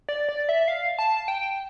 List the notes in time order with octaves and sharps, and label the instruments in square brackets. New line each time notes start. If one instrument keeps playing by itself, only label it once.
[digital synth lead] D5
D5
E5
F5
A5
G5